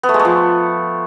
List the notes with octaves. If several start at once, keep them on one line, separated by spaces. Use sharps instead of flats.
B3
A3
G#3
A3
F3